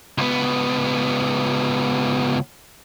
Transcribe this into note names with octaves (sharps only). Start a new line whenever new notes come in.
C#2 B3